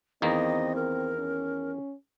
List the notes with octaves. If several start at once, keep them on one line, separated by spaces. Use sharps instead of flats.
E2 D#3 A#3 C4 D#5
A#4
C#4